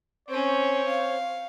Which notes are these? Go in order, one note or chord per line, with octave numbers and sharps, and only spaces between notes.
C4 C#4 C5 C#5
F5